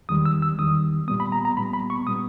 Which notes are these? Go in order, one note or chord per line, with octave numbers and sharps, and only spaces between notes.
E2 D#3 G3 D#6
E6
E6
E2 D#3 G3 D#6
A#2 G3 B3 D#6
B5
A#5
A#5
A#2 G3 B3 B5
B5
C#6
A#2 G3 B3 D#6